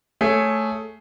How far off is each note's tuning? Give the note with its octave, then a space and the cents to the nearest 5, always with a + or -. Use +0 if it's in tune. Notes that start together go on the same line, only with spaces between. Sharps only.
A3 +0 G#4 +10 C#5 +0